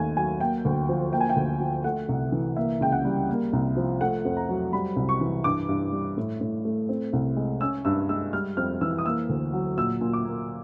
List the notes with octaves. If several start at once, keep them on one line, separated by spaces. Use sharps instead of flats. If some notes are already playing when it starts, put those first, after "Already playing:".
Already playing: D#2 A3 G#5
F#3 G#5
A#3 G5
D2
F3
A#3 G5
G#5
G5
D2
F3
A3 F#5
C2
E3
A#3 E5
C#2 G5
F#5
G3
A#3
C2
F3
A3 F#5
F2
A#5
F#3
G3 B5
C2
C#6
E3
G2 D6
G2
G3
A2
A2
A3
C4
C2
G#3
C#4 E6
G2 E6
G#3 E6
G3 F6
F2 F6
E3 E6
D#6
A#3 E6
D2
F#3
A#2 E6
A#2
D6
A#3